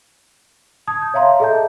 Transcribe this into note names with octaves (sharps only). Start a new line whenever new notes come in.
A5 D#6 G#6
G6
C#5 E5 F5 A#5 C6
G#4 A4 D#5 E5 A5 G6